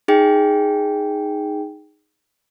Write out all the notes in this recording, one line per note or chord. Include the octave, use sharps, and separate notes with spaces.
D#4 G#4 G5